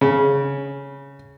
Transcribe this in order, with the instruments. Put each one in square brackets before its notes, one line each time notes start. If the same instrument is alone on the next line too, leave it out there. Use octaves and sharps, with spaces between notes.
[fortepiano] C#3